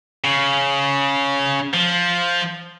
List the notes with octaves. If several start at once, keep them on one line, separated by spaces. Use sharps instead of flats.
C#3
F3